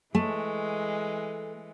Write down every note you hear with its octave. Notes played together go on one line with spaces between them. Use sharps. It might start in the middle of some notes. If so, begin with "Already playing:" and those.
E3 G#3 A3